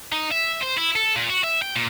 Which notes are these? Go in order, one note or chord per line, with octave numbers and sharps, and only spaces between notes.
D#4
E5
C5
E4
A4
A#2
F#4
E5
G5
A#2